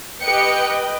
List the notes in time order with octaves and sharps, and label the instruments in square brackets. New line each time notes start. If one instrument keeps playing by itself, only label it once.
[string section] G4 C#7 [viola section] B4 D#5 G5